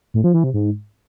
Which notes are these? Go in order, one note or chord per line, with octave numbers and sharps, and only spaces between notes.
A2
F3
E3
C3
G#2